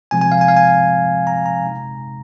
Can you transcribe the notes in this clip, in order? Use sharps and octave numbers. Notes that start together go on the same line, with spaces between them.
C3 F3 G#3 C4 G#5
G#5
F5
G#5
F5
G#5
A#5
A#5
C3 G#3 D#4